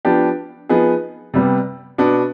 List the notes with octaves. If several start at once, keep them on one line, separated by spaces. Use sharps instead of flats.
F3 B3 D4 G4
F3 B3 D#4 G#4
C3 G3 B3
B2 B3 D4